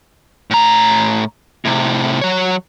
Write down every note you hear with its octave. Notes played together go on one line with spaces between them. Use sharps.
A2 A#5
A2 C3
F#3 C#5